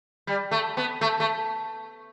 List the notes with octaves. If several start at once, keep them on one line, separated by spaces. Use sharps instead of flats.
G3
A3
B3
A3
A3